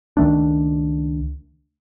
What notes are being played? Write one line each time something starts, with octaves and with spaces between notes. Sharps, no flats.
C#2 D#3 A3 D4